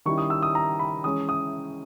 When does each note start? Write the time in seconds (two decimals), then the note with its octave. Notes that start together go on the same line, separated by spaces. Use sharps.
0.05 D#3 G3 C#4 E4 C#6
0.18 D#6
0.30 E6
0.42 D#6
0.55 A#5
0.79 B5
1.04 E3 G#3 C#4 D#6
1.29 D#6